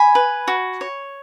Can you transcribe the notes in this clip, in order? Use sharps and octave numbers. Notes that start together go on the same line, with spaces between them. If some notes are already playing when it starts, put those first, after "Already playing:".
Already playing: G#5 B5
B4
F#4
C#5